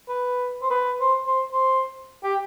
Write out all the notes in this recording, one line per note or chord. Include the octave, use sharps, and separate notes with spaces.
B4
C5
B4
C5
C5
C5
G4